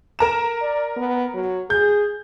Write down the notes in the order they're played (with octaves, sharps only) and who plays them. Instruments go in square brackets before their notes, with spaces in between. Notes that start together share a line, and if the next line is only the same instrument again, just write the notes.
[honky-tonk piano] A#4 A#5 E7
[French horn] D5
B3
F#3
[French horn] G#4 [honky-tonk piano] G6